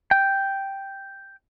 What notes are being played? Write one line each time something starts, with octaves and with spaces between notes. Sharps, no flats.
G5